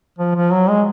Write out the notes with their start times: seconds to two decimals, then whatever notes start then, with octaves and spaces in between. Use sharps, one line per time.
0.18 F3
0.35 F3
0.52 F#3
0.69 G#3